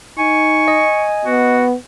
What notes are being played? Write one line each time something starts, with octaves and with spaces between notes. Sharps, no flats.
D#4 G#5 C#6
D#5
B3 F#4